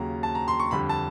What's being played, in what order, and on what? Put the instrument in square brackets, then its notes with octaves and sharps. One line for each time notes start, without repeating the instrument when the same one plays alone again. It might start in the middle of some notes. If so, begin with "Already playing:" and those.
Already playing: [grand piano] D#2 C#3 F#3 A#5
A5
A#5
C6
C#6
F2 D3 G3 B5
A5